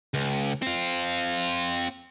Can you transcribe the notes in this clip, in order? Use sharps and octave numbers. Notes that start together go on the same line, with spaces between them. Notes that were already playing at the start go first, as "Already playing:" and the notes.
C#2
C4 F4